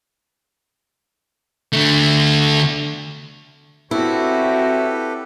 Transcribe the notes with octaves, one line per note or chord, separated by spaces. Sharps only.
D3 A3
C4 E4 F#4 G4 A4 B4 C#5